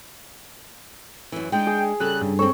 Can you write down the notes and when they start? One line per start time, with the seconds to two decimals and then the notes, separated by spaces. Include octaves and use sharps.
1.32 F#2 E3
1.52 G#3 D4 D#4 G5
1.67 G#4
2.00 C#3 G3 A4 F#6
2.22 G2
2.39 C4 A4 C#5